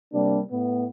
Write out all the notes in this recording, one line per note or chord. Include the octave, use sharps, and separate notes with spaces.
C3 G3 A#3 D4
A2 B3